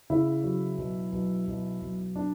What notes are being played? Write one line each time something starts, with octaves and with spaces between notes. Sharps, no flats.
C#3 E4
F#3
B1
B1
B1
B1
D4